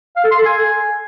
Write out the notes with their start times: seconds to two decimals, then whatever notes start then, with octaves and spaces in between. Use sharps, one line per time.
0.16 F5
0.24 A4
0.31 C6
0.38 A4
0.46 G#5